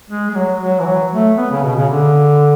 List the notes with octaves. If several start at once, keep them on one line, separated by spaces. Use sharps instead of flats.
G#3
G#3
F#3
F#3
E3
F#3
A3
B3
C#3
B2
C#3
D3